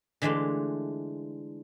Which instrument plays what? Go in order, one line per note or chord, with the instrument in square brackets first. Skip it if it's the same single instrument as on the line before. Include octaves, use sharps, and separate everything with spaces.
[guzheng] D3 E3 G#3 A3 F4